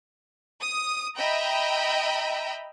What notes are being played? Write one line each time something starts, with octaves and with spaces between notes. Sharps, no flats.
D#6
D#5 E5 G5 A#5 B5